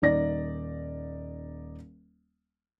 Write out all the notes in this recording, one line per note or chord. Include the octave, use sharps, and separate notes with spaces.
D#1 A#3 D#4 D5 A#6